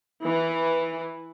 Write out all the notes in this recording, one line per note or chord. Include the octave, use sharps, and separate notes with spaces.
E3